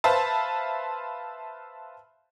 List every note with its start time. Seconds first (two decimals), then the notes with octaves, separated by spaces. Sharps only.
0.04 B4 C5 E5 F5 A5